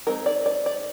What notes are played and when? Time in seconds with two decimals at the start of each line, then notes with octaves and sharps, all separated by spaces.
0.07 G#3 C4 D#4 A#4
0.26 D5
0.46 D5
0.66 D5